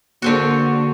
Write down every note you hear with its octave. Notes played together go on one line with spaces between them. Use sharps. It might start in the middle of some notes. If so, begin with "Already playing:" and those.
D3 A#3 C4 F#4